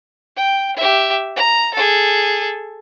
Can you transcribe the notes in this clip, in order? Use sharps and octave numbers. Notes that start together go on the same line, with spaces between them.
G5
G4 E5
A#5
G#4 A4